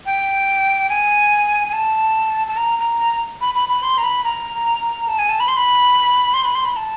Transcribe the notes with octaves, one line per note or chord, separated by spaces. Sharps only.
G5
G#5
G#5
A5
A5
A#5
A#5
B5
B5
B5
C6
A#5
B5
A#5
A5
G#5
A5
B5
C6
B5
C6
B5
C6
B5
A5